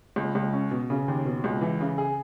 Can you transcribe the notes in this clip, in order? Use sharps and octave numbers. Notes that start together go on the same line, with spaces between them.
C#2
C#2
C#4
B2
C#3
D#2
B2
C#2
E3
C#3
G#4